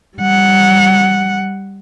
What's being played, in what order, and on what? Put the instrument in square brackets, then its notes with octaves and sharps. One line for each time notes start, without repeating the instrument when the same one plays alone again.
[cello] G3 F#5